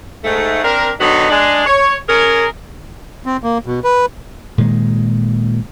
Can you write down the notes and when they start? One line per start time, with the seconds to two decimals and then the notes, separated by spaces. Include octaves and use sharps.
0.24 G#2 A3
0.64 C4 D4 A#4
1.01 D3 D#3 F#3 B3 D#4
1.30 G#3 D4
1.66 C#5
2.09 C#4 G#4 A#4
3.26 C4
3.44 A#3
3.66 B2
3.84 B4
4.58 A#2 D#3 G#3